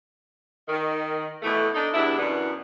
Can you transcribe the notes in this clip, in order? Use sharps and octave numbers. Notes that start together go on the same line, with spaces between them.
D#3
B2 E3 A3
D4 D#4
E2 G2 D4 E4
F#2 B2 E3 B3 D4